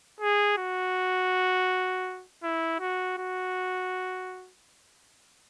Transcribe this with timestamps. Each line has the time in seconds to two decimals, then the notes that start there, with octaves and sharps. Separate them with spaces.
0.20 G#4
0.58 F#4
2.43 E4
2.80 F#4
3.18 F#4